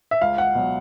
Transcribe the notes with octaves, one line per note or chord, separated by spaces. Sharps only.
E5
C#2 F5
F#5
B2 F#3